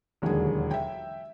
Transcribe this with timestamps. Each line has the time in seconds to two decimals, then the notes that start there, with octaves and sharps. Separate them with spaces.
0.22 E1 D#2 D3 F#3 G#4
0.71 E5 G5